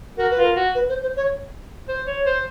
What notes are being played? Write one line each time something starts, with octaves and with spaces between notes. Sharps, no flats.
F#4 A#4
B4
F4
A#4
F#4
B4
C5
C5
C#5
C5
C#5
C5